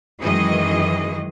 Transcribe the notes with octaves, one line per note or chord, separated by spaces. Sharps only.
F#2 D#3 E3 G#3 G#4 D#5